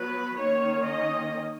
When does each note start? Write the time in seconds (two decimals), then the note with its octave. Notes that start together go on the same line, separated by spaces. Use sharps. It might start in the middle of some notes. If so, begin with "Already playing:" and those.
Already playing: F#3 B3 B4
0.38 D#3 A#3 C#4 C#5
0.85 D#5